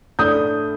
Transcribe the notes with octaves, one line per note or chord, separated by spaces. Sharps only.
A2 A3 D4 D#6 G6